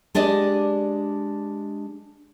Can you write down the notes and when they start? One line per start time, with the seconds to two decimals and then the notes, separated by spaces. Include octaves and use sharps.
0.15 G#3 D4 G4 D5 D#5